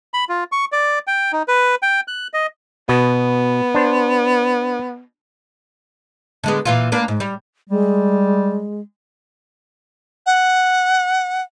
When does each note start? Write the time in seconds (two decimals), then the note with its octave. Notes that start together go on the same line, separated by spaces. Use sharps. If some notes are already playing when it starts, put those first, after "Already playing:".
0.14 B5
0.29 F4
0.52 C#6
0.72 D5
1.07 G5
1.33 D#4
1.48 B4
1.82 G5
2.08 F#6
2.34 D#5
2.89 B2 B3
3.75 D4 C5
6.44 D3 G#3 B3
6.65 A#2 E3 F4
6.92 A#3 D4 B4
7.08 G#2
7.20 G3
7.70 G3 G#3
10.26 F#5